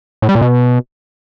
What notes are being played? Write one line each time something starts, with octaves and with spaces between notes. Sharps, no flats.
A2
G3
A#2
B2